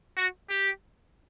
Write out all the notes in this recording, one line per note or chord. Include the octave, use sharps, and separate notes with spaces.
F#4
G4